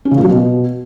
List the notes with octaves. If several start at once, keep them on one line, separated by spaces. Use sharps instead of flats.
C#4
C#3
A#2
F#3
B2